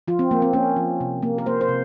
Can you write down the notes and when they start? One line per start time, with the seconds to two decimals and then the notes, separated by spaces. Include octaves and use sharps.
0.08 F3 F4
0.19 C4
0.31 F3 A#3
0.42 C4
0.53 A#3 C#4
0.77 F3
1.00 C3
1.22 A#3
1.38 A#4
1.46 A#3 C5
1.61 C5
1.69 C3